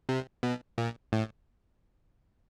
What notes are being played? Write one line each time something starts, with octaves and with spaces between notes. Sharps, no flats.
C3
B2
A#2
A2